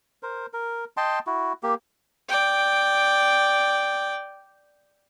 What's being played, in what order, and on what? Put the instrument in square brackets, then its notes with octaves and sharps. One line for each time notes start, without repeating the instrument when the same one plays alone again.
[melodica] A#4 C5
A#4
D#5 G5 A5 C6
E4 F#4
A#3 G4
[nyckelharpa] D5 G5